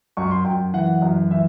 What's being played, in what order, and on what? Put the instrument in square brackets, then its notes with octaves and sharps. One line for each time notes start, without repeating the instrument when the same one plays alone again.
[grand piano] F#2 C#6
C6
F#2 G5
E3 F#5
F#2
E3 E5